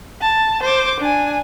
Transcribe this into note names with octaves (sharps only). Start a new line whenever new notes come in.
A5
C5 D6
D4 G#5